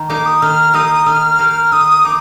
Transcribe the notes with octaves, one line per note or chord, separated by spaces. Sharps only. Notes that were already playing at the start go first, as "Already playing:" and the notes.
Already playing: D#3
A#3 D#4 G4 D6
D#6
D#3 F6
A#3 D#4 G4 D#6
D#3 F6
A#3 D#4 G4
D#3 D#6
A#3 D#4 D6